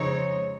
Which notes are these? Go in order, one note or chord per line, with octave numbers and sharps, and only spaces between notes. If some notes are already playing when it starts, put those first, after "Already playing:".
Already playing: F2 C#3 G#3 C4 D#4 C#5